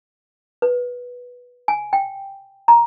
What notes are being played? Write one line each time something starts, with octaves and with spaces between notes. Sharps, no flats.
B4
G#5
G5
A#5